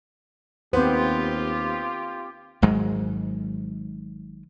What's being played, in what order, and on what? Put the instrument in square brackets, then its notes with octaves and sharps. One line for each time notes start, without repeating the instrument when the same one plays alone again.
[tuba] D#2 [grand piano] B3 [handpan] C4 C5 [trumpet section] F4 G4
[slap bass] G#1 G#2 F#3 G#3